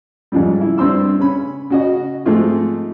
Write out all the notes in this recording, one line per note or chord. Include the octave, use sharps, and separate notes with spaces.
F2 G#2 C#3 F3 G3
E4
G2 G3 C4 C6 E6
C#3 C#4 B5
C#3 F#4 D#5
G#2 F3 G#3 A3 C4 F4